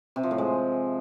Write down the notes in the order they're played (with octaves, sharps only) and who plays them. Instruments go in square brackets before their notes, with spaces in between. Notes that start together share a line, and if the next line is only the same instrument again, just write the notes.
[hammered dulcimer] C3
F3
A2
G#3